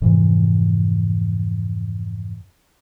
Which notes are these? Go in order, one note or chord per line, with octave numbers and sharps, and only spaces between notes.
F2 G#2 C3 E3